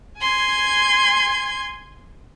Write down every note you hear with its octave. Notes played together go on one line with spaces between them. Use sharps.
G#5 C6 G#6